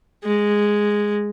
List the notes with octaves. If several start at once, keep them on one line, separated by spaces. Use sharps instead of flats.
G#3